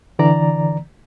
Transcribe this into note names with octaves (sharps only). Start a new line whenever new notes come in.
D3 E3 D5 A#5